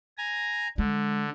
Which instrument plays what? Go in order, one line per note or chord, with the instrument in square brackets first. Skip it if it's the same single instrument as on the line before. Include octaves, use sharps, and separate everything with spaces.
[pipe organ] G#5 A#5
[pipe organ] D3 [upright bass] G#3